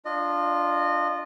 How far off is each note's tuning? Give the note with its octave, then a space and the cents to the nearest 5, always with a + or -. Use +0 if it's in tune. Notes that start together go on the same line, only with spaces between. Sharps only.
D4 +0 F4 +0 D#5 -30